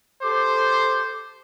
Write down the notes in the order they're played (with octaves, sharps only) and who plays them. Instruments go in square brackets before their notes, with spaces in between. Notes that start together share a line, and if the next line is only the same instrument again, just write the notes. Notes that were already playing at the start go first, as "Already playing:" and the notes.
[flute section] G4 A4 D6 [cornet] C5